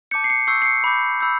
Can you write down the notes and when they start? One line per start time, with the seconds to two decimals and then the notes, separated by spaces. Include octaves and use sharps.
0.11 A5 D6 G6 C#7
0.24 C7
0.30 C#7
0.47 C#6 E6 G6 C7
0.62 C7
0.66 C#7
0.84 B5 D6 G6
1.21 B5 E6 G6